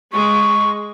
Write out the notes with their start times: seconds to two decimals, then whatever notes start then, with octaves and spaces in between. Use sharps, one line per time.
0.12 G#3 C#6